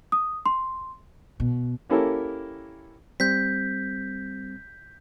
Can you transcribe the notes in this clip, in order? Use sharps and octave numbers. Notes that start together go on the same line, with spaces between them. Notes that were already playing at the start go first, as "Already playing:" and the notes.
D#6
C6
B2
A#3 C#4 E4 G4 A4 A#4
G3 C4 G6 B6